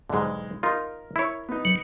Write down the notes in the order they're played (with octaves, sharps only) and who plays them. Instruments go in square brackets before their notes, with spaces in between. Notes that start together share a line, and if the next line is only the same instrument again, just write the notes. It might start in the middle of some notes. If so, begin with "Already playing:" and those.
[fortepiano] B1 G#3 [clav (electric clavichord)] G#2 D3
[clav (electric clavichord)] D#4 F4 [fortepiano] A#4
[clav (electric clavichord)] E4 C#5
[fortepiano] B3 D#4
[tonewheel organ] F#3